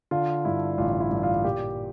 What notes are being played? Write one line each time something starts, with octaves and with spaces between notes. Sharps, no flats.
D3 F4
G2 E4
A1 F4
E4
G2
F4
A#2 G4